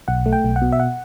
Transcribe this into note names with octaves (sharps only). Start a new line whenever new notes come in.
B1 F#5
A3
G5
B1
F#5
B2
E5
F#5